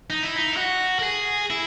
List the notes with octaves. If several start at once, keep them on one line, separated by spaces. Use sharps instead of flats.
D#4
E4
D#4
E4
F#4
A#4
G#4
E4